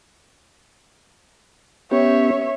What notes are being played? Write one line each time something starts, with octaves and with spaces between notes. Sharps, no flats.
B3 C#4 G4 C#5 E5